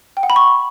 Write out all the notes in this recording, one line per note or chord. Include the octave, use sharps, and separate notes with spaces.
G5
F#5
B5
C#6